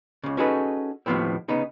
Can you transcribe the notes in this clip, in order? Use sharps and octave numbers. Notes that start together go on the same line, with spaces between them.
C#2 C#3
C#4 D#4 F#4 G#4 A4 B4
D#2 A2 C3 F3 B3 C4
C#3 B3 D#4